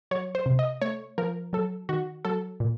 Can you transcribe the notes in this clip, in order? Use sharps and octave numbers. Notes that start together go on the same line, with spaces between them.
F#3 C#5
C5
C3
D#5
A3 C#5
F3 A#4
F#3 A4
D#3 F#4
F#3 A4
A#2